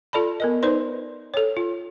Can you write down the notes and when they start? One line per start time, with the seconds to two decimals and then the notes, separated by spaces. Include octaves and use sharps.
0.13 F4 A4 D5 A5 B5
0.40 B3 A#4 D#5
0.63 D#4 B4 C5 D5 C6
1.34 A4 C#5
1.57 F4